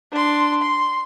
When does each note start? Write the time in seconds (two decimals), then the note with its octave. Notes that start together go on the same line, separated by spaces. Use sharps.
0.12 D4 C6
0.62 C6